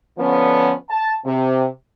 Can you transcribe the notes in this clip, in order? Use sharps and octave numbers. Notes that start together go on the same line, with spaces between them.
D3 F3 B3 C#4
A5
C3